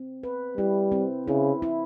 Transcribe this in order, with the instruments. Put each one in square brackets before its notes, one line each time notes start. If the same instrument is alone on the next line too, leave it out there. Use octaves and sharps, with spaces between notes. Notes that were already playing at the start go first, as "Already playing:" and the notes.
Already playing: [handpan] C4
B4
[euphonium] G3 [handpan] E4
[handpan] C4
[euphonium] C#3 [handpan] E4
[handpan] E4